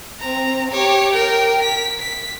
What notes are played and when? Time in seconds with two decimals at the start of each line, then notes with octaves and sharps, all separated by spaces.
0.20 C4 A#5
0.71 G4 C#5
1.13 A#4 G5
1.63 B6
2.00 B6